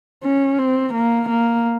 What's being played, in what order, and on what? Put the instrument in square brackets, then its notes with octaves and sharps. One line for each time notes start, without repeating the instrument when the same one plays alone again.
[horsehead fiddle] C#4
C4
A#3
A#3